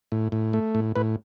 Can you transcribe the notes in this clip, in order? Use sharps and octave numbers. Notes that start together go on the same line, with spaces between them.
A2
A2
A3
A2
A2 B4